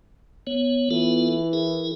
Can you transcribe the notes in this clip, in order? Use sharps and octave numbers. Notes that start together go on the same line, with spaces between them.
B3 C#5
E3 B3 F4 A4
E4 G#4 A#4